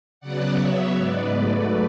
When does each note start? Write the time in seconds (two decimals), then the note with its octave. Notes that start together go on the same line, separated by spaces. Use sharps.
0.20 C#3 F#3 B3 D5 F#5
0.58 C#3 F#3 B3 C#5 E5
0.95 G#2 G#3 B3 B4 D5
1.33 G#2 F#3 A3